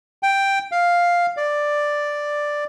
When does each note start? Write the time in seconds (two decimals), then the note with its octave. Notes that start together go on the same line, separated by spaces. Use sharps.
0.23 G5
0.72 F5
1.37 D5